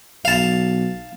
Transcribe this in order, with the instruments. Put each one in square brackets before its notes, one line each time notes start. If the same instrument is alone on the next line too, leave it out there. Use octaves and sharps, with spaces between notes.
[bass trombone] B1 [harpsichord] F5 A5